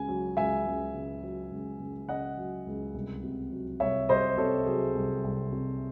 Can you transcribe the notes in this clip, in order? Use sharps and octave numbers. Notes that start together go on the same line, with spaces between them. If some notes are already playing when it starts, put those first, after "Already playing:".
Already playing: C#2 C#3 G#5
F#3
C#2 E5 G#5
C#2
C#3
F#3
C#2
C#2
C#3 D#5 F#5
F#3
C#2
C2
C3
F#3
C2 C#5 E5
C2 C5 D#5
C3 A4 C#5
F#3 G#4
C2
C2
C3